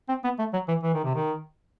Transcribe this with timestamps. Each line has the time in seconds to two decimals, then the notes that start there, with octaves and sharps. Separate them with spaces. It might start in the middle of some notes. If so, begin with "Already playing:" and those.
0.09 C4
0.24 B3
0.39 A3
0.54 F#3
0.68 E3
0.83 E3
0.94 D#3
1.04 C3
1.15 D#3